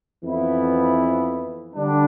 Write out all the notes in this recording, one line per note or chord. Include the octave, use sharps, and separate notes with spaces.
F2 E3 B3 E4
D3 G3 D4